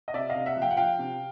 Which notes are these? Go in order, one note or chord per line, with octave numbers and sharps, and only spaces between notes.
D#5
C3 D5 E5
D#5 F5
C3
E5 F#5
F3
F5 G5
F#5
F3 F5 G5
C3